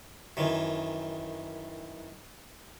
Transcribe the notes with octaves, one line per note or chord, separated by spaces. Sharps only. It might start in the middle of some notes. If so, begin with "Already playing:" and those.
F#2 D#3 E3